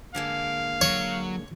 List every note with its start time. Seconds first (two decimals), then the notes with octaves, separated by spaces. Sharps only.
0.15 D3 G#3 A#3 F5
0.81 F#3 C#5